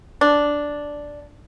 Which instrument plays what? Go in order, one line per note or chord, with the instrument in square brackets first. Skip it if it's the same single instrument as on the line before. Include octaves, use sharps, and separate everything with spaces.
[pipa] D4